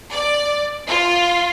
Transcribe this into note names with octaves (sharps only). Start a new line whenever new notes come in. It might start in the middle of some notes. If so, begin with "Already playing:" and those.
D5
F4